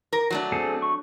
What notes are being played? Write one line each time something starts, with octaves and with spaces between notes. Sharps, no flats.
A#4
F#3 A3 D4
C4 G#4 A4
C#6